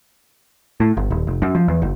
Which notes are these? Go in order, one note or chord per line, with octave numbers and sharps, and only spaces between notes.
A2
G1
D#1
F1
F#2
F3
E2
F#1